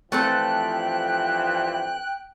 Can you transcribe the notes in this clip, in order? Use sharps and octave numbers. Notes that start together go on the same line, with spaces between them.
G2 E3 F3 A3 C4 A4 G5 F#6